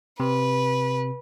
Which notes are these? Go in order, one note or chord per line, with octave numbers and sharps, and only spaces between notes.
C3 B4